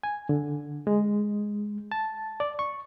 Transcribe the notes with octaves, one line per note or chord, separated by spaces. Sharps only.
G#5
D3
G#3
A5
D5
C#6